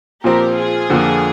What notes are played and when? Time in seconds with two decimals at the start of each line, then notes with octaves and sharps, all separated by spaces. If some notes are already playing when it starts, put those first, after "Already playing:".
0.23 A#2 F3 C4 G4 A#4
0.56 F4 G#4
0.90 F2 D3 F3 A#3